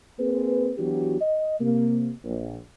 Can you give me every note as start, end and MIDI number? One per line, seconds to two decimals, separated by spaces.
0.19 0.71 58
0.19 0.71 60
0.19 0.71 68
0.19 0.71 71
0.78 1.18 52
0.78 1.18 54
0.78 1.18 59
0.78 1.18 62
0.78 1.18 66
0.78 1.18 67
1.20 1.55 75
1.59 2.11 48
1.59 2.11 58
2.24 2.56 34